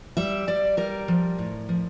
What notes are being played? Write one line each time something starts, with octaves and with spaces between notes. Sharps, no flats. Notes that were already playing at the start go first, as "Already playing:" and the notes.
G3 E5
G3 D5
G3 A#4
F3
A2
F3